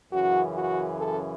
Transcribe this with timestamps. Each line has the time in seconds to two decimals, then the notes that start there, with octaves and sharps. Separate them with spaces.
0.12 F#2 C#3 E3 F#4
0.55 F#4
0.98 A4